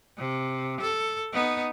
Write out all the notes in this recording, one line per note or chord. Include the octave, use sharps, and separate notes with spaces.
C3
A4
B3 D#4